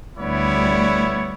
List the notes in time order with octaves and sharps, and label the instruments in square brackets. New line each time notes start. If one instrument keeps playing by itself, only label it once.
[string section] D2 [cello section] G3 D5 [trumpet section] B3 E4 C#5